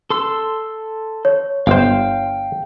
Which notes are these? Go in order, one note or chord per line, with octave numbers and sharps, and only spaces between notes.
A4 C6 E6
C#5
G1 C5 F5 G5